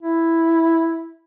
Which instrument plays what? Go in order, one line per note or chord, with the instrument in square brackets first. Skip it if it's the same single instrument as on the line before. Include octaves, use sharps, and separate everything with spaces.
[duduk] E4